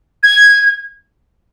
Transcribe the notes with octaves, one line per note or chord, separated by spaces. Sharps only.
G#6